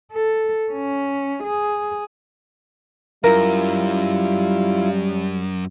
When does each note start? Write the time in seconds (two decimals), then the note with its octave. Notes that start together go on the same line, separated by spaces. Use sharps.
0.12 A4
0.72 C#4
1.44 G#4
3.24 F#2 G3 E4 F4 A#4